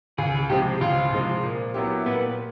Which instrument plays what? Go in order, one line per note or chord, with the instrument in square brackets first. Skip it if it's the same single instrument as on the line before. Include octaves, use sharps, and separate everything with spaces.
[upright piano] C#2 [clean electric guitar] G#4
[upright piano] C3 F3 G#3 C4 [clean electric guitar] G4
[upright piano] C#2 [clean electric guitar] F4
[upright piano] C3 F3 G#3 C4
A#2
F#3 B3 E4 G4
[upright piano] A#2 [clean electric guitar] B3